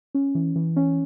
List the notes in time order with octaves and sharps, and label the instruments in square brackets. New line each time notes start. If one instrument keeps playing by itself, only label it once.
[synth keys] C#4
E3
E3
C#4